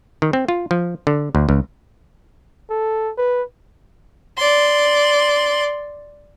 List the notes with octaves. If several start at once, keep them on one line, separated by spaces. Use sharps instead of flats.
D#3
C4
F4
F3
D3
D2
C#2
A4
B4
D5 C6